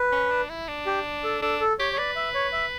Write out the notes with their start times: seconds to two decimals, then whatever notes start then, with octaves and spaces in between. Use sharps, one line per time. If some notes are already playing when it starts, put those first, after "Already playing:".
Already playing: B4
0.12 C#4
0.31 D4
0.50 E4
0.68 D4
0.86 G4
1.24 A4
1.41 D4 A4
1.61 A4
1.79 G4 C#5
1.92 C#5
1.98 B4 D5
2.16 E5
2.34 C#5
2.52 E5